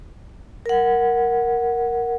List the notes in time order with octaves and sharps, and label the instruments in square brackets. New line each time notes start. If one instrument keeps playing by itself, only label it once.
[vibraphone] A#4 F#5